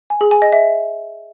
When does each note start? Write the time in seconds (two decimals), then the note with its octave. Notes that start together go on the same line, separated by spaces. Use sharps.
0.10 G#5
0.21 G#4
0.31 G#5
0.42 D#5
0.52 E5